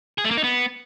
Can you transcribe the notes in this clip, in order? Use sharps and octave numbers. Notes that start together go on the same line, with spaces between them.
G#4
A3
A#3
D#4
B3